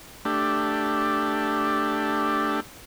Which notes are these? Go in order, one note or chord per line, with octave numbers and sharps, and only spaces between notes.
A3 D4 G4